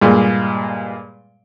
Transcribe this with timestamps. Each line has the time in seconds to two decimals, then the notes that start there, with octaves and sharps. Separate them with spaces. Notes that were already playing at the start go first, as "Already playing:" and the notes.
0.02 G2 A#2 G#3 A#3